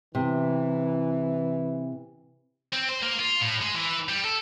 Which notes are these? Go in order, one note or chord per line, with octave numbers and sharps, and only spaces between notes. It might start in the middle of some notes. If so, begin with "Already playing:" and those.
C3 E3
C4
C5
A#3
F4
A2
G#3
E3
G3
A4